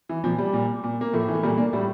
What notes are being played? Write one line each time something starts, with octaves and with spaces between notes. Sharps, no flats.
E3
A#2 F3
G3
A#2
A#2
A#3
A2 F3 A3
E3
A3
A#2 G3 A#3
A#3 D4
A2 G3